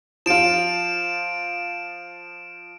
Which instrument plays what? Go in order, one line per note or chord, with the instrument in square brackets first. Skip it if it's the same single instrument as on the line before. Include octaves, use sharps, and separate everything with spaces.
[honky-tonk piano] F3 F4 [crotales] D7 E7